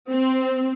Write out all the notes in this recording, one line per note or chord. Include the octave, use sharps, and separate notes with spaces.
C4